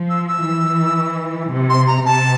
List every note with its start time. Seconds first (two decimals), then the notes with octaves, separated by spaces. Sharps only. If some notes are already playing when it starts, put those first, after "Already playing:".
Already playing: F3
0.09 E6
0.27 E6
0.44 E3
1.51 C3
1.69 C6
1.87 A#5
2.05 C3 A5